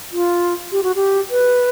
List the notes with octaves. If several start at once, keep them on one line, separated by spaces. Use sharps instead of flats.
F4
G4
F#4
G4
B4